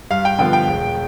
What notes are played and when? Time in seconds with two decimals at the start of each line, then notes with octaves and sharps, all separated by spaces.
0.11 G2 F5
0.25 G5
0.38 D3 F3 B3 G5
0.53 G5
0.67 E1